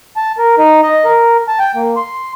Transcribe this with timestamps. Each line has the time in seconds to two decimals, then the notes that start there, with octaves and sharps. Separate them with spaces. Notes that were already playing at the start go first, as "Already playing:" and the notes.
0.16 A5
0.38 A#4
0.58 D#4
0.83 D#5
1.05 A#4
1.48 A5
1.59 G5
1.75 A#3
1.97 C6